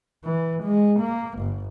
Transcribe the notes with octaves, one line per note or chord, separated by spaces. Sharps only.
E3
G#3
A#3
G1